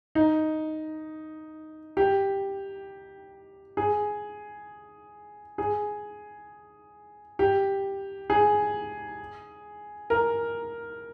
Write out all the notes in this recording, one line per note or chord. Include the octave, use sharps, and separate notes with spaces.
D#4
G4
G#4
G#4
G4
G#4
A#4